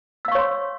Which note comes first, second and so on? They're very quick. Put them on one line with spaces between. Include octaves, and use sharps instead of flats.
E6 F5 C#6 C#5 C6